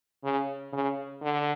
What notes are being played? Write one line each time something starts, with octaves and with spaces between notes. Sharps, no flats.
C#3
C#3
D3